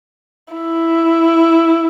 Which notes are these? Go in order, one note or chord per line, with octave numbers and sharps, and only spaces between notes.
E4